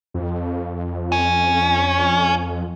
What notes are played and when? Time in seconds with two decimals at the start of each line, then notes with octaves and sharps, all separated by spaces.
0.14 F2
1.12 C#4